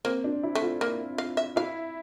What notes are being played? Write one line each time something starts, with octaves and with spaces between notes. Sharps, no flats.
A#3 C4
D4
E4
A3
F4
A#3
F5
E5
E4 F5